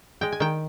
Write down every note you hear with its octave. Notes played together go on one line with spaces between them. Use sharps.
G#3 G5
G#5
D#3 G5